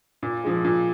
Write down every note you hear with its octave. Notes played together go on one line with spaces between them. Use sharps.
A#2
F3 G#3
A#2